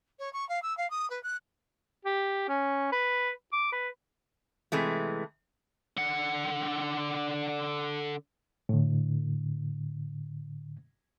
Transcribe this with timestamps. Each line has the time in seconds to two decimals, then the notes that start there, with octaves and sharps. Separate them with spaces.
0.19 C#5
0.33 C#6
0.49 F5
0.62 E6
0.77 F5
0.90 D#6
1.10 B4
1.23 F#6
2.05 G4
2.48 C#4
2.92 B4
3.53 D6
3.72 B4
4.72 C3 E3 G#3 A3
5.97 D3 F#5
8.69 A2 D3